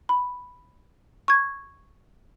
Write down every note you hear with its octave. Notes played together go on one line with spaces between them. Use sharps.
B5
C#6 G#6